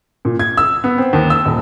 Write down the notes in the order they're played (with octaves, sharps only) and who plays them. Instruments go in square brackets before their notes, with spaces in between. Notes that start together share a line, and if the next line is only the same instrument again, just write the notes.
[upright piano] A#2
G#6
E6
B3
C4
D#2
E6
D#1